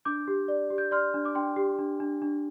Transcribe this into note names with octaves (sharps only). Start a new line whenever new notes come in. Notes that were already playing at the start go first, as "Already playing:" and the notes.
D4 D6 G6
G4
D5
G4
G6
D5 C6 F6
D4
D6
D4 G5 C6
G4
D4
D4
D4